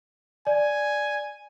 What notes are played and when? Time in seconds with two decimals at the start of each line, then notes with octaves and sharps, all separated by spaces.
0.47 D5 G#5